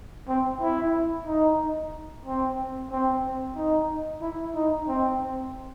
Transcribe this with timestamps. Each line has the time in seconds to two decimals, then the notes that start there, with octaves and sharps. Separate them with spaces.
0.28 C4
0.61 E4
1.27 D#4
2.25 C4
2.91 C4
3.56 D#4
4.22 E4
4.55 D#4
4.88 C4